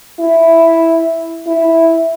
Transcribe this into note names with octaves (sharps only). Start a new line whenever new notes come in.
E4
E4